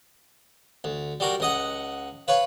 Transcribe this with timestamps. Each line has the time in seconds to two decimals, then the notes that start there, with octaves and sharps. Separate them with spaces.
0.84 D2
1.20 G3 F#4 A#4
1.40 C#2 D#5 F#5
2.28 B4 C#5 F5